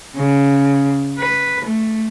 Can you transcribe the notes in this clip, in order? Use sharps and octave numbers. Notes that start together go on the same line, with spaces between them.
C#3
B4
A3